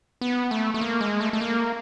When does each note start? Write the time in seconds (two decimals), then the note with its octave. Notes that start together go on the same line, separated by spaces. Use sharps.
0.21 B3
0.51 A3
0.74 A3
0.81 A#3
1.01 G#3
1.21 A3
1.33 A3
1.41 A#3